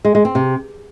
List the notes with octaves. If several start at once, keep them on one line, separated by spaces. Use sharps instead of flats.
G#3
G#3
C4
C3